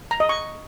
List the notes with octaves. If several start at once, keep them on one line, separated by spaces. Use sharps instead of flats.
A#5
D#5
C#6